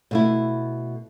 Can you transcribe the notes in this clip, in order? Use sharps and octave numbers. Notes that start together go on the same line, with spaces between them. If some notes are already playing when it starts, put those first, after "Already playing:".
B2 A3 E4